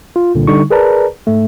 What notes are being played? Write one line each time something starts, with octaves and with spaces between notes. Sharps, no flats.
F4
C2 A#2 D3
D3 G3 D#4 C#6
G#4 A#4 B4 D5 A5 A#5
G#2 A3